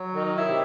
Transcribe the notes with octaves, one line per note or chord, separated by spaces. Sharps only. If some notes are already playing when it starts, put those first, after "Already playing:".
Already playing: F#3
D#3 D#4
E4
C3